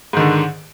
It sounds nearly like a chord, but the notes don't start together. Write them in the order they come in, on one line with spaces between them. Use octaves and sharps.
G#2 D#3 D3